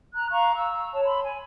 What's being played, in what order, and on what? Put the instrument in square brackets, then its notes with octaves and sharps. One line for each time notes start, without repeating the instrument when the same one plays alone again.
[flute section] A#5 F#6
F5 A#5 C#6
E6
C#5 A5
B5 C6
G#5